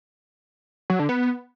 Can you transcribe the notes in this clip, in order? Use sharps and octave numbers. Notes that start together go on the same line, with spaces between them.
F#3
D3
B3